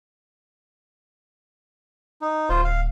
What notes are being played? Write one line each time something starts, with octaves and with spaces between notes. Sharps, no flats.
D#4
D1 F4 C5
F5